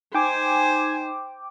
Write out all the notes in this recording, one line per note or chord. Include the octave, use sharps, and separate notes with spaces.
D#4 C5 G5 G#5 D6